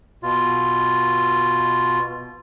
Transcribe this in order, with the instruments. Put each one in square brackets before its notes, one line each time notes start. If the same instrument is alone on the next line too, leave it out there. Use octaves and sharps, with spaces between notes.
[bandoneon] B2 F4